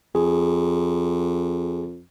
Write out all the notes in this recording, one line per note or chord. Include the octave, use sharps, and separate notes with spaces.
F2 G#4